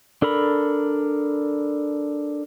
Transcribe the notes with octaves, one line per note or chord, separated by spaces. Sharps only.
D4 A4 A#4 B5